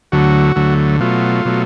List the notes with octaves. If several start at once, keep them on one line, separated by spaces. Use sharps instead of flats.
D2 D3 F#3 A3 F#4
D2 D3 F#3 A3
B2 F#3 A3 F4
B2 F#3 A3